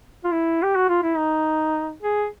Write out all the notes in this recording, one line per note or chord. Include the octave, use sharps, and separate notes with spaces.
F4
E4
G4
F#4
F4
E4
D#4
G#4